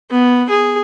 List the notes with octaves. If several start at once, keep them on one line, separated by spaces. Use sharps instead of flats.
B3
G#4